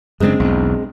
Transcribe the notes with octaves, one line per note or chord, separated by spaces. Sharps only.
F#2 C#3 G#3 C4 D4
B1 E2